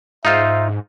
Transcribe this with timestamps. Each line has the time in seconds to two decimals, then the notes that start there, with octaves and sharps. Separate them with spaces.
0.25 G#2 D#4 F4 C5 E5